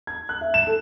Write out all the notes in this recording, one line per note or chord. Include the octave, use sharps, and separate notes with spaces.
G#6
F#6
E5
E7
A4